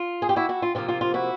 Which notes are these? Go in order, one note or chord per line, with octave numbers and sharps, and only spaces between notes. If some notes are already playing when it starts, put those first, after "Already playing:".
Already playing: F4
G#4
G4
E4 F#4
E4 F#4
F4
C3 F3 A#3 F4
F4
F4
E4 F#4